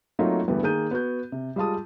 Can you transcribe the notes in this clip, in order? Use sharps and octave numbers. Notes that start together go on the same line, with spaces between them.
F#3 A3 A#3 C4 D#4 F4
E1 D2 G2 E3 B3 G4
D#3 A#3 G#4 G6 D#7
B3 F#4 G6
C3
G3 G#3 F4 A5 D#6